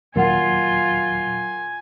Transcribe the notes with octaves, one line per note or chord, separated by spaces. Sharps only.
D#2 A#2 F#3 F4 A#4 F#5 G#5